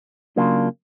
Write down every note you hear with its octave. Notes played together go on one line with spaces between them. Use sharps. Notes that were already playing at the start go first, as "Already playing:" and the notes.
C#3 F#3 A#3 D4 F4